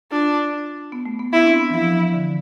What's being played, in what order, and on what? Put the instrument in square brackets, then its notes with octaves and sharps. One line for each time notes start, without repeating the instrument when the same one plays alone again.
[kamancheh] D4 [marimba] F4
[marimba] B3
A3
B3
[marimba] B3 [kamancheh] E4
[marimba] D4
C4
B3
E3
[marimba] F3 [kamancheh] E4
[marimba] F3
E3
E3
D3